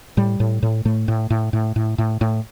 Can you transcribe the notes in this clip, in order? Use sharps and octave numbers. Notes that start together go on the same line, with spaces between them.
A2 G3
A2
A2
A2 A3
A2
A2
A2
A2
A2
A2